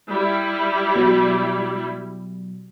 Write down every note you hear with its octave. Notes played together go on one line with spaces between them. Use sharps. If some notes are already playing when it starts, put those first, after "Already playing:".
G3 E4
B2 F#3